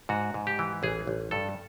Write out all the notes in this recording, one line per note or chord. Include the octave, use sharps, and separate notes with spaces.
G#2 F#4
G#2
G4
E3
A1 G#4
A1
G2 A4